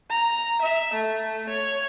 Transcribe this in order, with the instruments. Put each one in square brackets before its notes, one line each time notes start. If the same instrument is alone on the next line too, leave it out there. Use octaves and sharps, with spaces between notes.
[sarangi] A#5
E5
A3
C#5